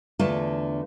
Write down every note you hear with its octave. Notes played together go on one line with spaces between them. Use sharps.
E2 D3 A3 F4 A5